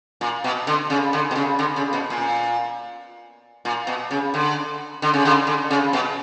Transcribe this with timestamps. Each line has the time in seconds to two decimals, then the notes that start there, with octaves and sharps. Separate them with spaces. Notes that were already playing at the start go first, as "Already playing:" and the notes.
0.21 A#2
0.44 B2
0.67 D3
0.90 C#3
1.13 D3
1.31 B2
1.36 C#3
1.59 D3
1.76 C#3
1.93 B2
2.10 A#2
3.65 A#2
3.87 B2
4.11 C#3
4.34 D3
5.02 D3
5.14 C#3
5.25 D3
5.47 D3
5.70 C#3
5.93 B2